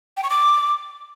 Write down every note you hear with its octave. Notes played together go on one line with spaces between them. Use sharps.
G5
C#6
D6